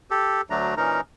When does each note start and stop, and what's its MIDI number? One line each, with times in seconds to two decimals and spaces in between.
0.11 0.41 67
0.11 0.41 69
0.50 0.75 38
0.50 0.75 54
0.50 0.75 57
0.50 0.75 62
0.50 0.75 82
0.77 1.01 46
0.77 1.01 52
0.77 1.01 61
0.77 1.01 63
0.77 1.01 70
0.77 1.01 82